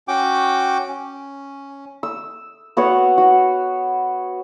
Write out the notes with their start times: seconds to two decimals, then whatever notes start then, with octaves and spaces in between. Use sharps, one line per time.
0.08 C#4 F#4 G5 D6
0.88 C#4
2.03 E6
2.77 B3 F#4 C#5 F#5
3.18 F#4